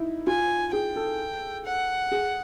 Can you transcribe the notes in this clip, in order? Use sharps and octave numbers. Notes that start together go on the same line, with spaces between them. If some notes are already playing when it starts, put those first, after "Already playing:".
Already playing: D#4 E4
F4 G#5
G#4 G5
A4
F#5
G#4